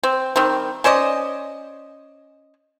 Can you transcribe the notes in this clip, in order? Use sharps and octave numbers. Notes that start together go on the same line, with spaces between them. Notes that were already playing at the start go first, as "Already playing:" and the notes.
C4
D#3 G3 C4
C#4 C5 D5 D#5